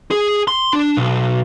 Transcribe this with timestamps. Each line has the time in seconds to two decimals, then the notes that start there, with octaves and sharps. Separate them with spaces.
0.11 G#4
0.48 C6
0.73 D4
0.97 B1